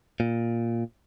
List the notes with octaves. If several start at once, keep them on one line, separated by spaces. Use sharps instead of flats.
A#2